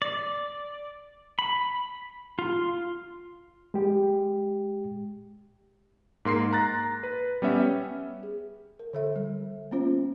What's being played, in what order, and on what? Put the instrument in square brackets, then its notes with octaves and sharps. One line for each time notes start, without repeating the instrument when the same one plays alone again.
[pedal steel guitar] D5
B5
F4
[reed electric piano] G#3 G4
[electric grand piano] G#2 A#3 C6 C7
A#5 F#6 A6 A#6
B4
G3 B3 C#4 E5
[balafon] G#4
A#4
D3 A4 E5
G3
A#3 B3 C#4 F4 C5